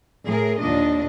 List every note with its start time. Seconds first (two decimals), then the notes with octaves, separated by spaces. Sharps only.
0.25 A2 G#4 A#4
0.61 D#2 A#2 D4 D#5